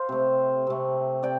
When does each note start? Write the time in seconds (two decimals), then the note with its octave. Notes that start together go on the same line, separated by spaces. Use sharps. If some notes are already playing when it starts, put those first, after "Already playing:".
Already playing: C5 F5
0.09 C3 A3
0.67 C3 A3
1.23 C3 D5 G5